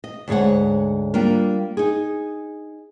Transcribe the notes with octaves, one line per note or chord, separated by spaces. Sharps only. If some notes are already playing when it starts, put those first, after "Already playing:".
D#5
D2 G#2 G#4 C#5 F#5
G3 A#3 D4 F4 A#4
D#4 G#4